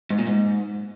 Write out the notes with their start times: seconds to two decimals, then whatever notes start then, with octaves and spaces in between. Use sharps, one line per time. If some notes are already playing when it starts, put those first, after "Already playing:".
0.10 G#2
0.19 A#2
0.27 G#2